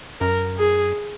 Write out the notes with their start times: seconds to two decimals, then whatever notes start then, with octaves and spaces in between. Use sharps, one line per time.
0.21 F#2 A#4
0.58 G#4